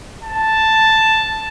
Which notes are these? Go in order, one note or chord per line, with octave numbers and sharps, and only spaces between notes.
A5